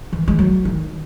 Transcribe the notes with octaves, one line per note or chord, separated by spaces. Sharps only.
E3
G#3
F#3
D#3